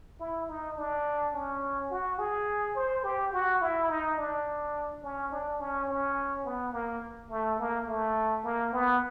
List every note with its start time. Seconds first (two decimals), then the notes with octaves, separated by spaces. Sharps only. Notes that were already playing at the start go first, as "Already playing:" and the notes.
0.20 E4
0.49 D#4
0.77 D4
1.34 C#4
1.91 F#4
2.19 G#4
2.76 C5
3.04 G4
3.33 F#4
3.61 E4
3.89 D#4
4.17 D4
5.03 C#4
5.31 D4
5.60 C#4
5.89 C#4
6.45 B3
6.73 A#3
7.30 A3
7.59 A#3
7.87 A3
8.43 A#3
8.73 B3